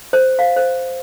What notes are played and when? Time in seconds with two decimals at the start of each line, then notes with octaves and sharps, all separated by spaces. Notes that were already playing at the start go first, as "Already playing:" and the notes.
0.13 C5
0.39 F5
0.56 C5